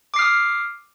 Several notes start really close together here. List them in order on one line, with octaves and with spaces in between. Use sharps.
D6 C7 F6 D#6